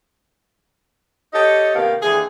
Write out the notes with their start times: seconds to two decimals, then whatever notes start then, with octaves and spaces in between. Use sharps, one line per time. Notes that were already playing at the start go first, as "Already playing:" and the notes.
1.33 G4 A4 C#5 D#5
1.74 C3 D#3 A#3 B3 G4 F5
2.03 D#2 D3 E3 G#4